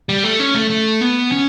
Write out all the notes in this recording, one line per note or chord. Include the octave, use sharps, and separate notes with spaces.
G3
A3
C#4
A3
A3
B3
C#4